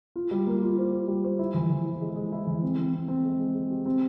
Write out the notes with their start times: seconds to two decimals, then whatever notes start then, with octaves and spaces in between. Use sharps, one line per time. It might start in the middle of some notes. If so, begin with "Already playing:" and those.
0.16 F4
0.31 G3
0.47 A#3
0.62 F4
0.78 C5
0.93 F4
1.08 G3
1.24 C5
1.39 E4
1.54 E3
1.70 E3
1.85 E4
2.01 G#3
2.16 G#3
2.32 E4
2.47 E3
2.62 C4
2.78 C4
2.94 C4
3.08 C4
3.24 G#3
3.39 G#3
3.54 G#3
3.70 G4
3.86 C4